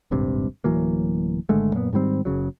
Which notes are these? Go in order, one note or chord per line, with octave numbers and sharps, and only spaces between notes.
D#1 G#1 G2 C3
D1 E3 F#3 A#3
G#1 D3 G#3 A3
F#2 A#2 A#3 B3
G#2 D#3 G3 C4
F#1 C#2 C#3 F#3